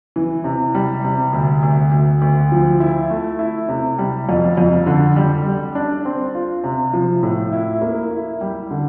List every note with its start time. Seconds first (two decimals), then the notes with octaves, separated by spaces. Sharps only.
0.16 E3
0.44 C3
0.75 G3
1.04 C3
1.33 D2
1.63 D2
1.92 D2
2.22 D2
2.52 F3
2.80 E4
3.10 A3
3.39 E4
3.69 C3
3.98 G3
4.29 F2
4.57 F2
4.86 D3
5.16 G3
5.46 G3
5.75 D4
6.05 C4
6.34 F4
6.64 C3
6.93 F3
7.23 A2
7.53 E4
7.82 A#3
8.11 E4
8.41 G3
8.71 D3